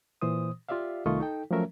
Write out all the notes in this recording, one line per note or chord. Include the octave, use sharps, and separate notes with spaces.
A#2 E3 C5 D#6
F4 G4 D5 E5 F5
C2 D#3 A3 F4 D#5 C#6
D#4 A4 G5
F3 F#3 A3 C#4 A#4 E5